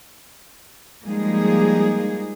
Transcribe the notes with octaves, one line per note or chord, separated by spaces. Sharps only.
F3 G3 G#3 A#3 D#4 G#4